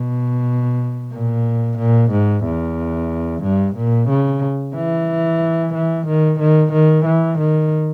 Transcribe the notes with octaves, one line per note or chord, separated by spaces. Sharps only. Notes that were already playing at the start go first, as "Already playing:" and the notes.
Already playing: B2
A#2
A#2
G#2
E2
G2
A#2
C#3
E3
E3
D#3
D#3
D#3
E3
D#3